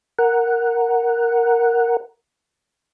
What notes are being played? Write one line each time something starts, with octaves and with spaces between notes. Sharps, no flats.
A#4 F#5